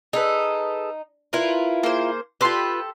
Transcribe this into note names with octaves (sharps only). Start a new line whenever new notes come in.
D#4 G#4 A4 B4
E4 F4 A#4 B4
A#3 G#4 C5
F4 G4 A4 B4 C6